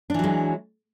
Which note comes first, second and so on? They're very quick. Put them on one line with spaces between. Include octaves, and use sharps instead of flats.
D4 E3 F#3 G#3